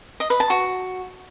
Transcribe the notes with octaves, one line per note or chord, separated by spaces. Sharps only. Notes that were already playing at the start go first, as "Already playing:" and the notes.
D#5
B4
A5
F#4